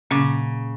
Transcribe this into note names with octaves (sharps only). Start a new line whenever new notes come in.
A#2 C#3 F#3 A#3